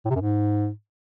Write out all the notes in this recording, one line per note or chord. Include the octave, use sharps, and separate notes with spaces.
A2
C3
F#2
G#2